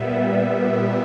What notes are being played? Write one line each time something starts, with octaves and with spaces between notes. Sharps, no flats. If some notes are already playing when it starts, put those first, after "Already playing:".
Already playing: A#2 G3 B3 E5
E5